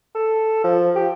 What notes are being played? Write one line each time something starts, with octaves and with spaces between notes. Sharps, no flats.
A4
F3
G4